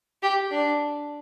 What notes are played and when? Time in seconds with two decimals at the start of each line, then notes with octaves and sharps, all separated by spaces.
0.23 G4
0.51 D4